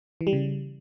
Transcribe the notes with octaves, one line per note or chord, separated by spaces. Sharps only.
E3
G3
C#3